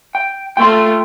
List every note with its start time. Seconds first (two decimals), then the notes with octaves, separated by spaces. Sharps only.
0.15 G5
0.57 A3 F4 G5 C6